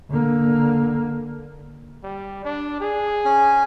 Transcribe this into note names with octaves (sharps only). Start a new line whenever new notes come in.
D3 A#3
G3
D4
G#4
C#4 G#5